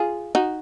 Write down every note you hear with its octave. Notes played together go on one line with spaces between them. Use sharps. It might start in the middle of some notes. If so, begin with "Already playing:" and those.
Already playing: F4 G#4
D#4 F#4